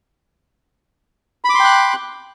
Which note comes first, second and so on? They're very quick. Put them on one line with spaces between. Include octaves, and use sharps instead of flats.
B5 D6 C6 G5 F#6